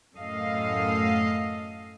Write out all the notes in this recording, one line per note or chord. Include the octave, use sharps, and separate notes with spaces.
F#2 A2 A4 D#5 F5